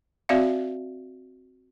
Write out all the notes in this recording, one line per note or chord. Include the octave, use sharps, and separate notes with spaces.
C4 F#4 D5 E5 F5